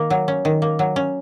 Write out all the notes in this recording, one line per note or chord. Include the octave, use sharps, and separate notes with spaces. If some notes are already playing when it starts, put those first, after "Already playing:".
Already playing: D#3 A#3
F#3
C#4
D#3
A#3
F#3
C#4